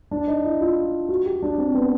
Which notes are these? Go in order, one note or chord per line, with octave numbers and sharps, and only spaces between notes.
D4
D#4
E4
F4
F#4
G4
D4
C4
B3